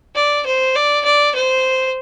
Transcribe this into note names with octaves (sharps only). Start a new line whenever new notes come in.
D5
C5
D5
D5
C5